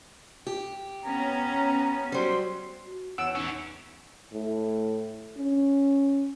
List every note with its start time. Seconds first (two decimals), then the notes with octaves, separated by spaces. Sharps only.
0.47 G4
1.03 B3 C#4 A#5
2.12 F#3 G3 C5
2.85 F#4
3.18 E2 C#5 F#5 E6 D7
3.35 E3 C#4 D#4
4.33 A2
5.37 C#4